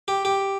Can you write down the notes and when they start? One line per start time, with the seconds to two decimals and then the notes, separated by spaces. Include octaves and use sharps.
0.08 G4
0.25 G4